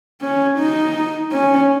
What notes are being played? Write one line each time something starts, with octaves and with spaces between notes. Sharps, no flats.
C#4
D#4
C#4